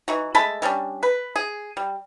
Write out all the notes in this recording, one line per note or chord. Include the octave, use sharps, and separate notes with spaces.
E3 D#4 F#4
G#3 A3 A5 B5
E3 G3 C#4 D4
B4
G#4
G3